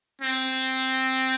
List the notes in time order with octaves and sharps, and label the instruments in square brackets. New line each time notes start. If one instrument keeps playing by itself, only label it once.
[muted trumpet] C4